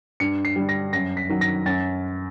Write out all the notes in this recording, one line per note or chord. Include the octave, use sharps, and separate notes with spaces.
G2 C#7
C7
D3 G3
A#6
F#2 A#6
B6
D#3 F#3
A#6
F#2 A6